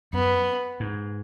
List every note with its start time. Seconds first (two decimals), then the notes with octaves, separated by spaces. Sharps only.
0.13 F#2 B3
0.80 G#2